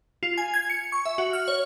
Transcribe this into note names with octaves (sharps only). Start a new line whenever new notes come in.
F4
G#5
G#6
C#7
C#6
E5
F#4
F6
C#5